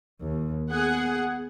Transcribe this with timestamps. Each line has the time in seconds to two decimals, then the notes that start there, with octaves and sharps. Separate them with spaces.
0.21 D#2
0.70 B3 G#4 F#5